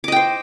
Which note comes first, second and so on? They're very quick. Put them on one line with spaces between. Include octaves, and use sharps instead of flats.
D6 D#5 G5 C5